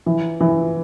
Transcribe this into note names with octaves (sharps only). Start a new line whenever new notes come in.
E3
E3